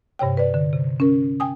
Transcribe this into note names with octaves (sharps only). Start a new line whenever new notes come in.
G2 C3 C#5 G5
B4 D5
D3
C3
C#4 A#4
G5 G#5 D#6